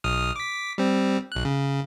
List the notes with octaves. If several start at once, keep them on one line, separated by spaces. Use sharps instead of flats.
B1 D#6 F6
D6 B6
G3 C4
B1 F#6
C#3